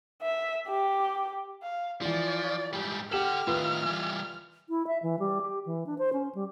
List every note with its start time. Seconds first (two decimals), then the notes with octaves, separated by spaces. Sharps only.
0.22 E5
0.69 G4
1.63 F5
2.01 E3 F3 F4 D5
2.73 G#2 G3 G4
3.12 G4 A4 F#5 F6 E7 F#7
3.47 A2 D#3 F4 B4
3.86 E3 G3
4.69 E4
4.87 E5
5.03 E3
5.19 G3
5.41 G4
5.66 E3
5.87 D4
5.98 C5
6.13 C#4
6.35 G3